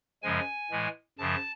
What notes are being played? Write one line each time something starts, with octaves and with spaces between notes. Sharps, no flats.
F#2 C#3 F3 G#3 G#5
A2 E3 G#3
F#2 C#3 F3 A5